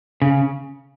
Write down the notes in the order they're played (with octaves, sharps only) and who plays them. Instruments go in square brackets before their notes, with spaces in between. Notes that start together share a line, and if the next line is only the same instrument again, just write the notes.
[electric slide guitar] C#3